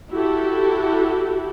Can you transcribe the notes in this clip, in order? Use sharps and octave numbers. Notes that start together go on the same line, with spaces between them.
E4 F#4 G4 A4